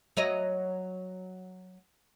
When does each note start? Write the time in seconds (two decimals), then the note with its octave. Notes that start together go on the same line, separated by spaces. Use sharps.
0.17 F#3 C#5 D#5